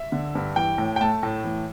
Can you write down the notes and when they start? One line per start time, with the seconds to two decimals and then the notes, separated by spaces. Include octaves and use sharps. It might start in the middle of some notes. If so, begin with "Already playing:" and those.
Already playing: E5
0.12 D3
0.35 G2
0.56 E3 G5
0.78 A2
0.96 G5
1.01 A3 A5
1.23 A2
1.44 E3